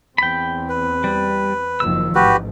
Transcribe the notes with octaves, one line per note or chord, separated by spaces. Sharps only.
E2 C4 G5 B5
B4
G3
F#1 D#3 F3 E6
A1 G#2 F#4 G4 B4